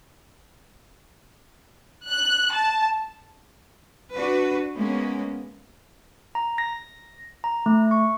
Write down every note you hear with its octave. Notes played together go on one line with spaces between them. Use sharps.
F#6
A5
D4 F#4 B4
G#3 A#3 B3 C#4
A#5
A#6
A#5
A3
C#6